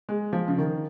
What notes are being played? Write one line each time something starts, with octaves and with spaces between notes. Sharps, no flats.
G#3
F3
C#3
D#3